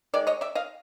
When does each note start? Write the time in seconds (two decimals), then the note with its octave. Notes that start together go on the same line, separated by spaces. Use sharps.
0.14 D#3 G#3 D5
0.27 C#5 D#5
0.41 D5 E5
0.55 D#5 F5